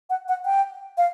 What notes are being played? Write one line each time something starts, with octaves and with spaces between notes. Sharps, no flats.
F#5
F#5
G5
F5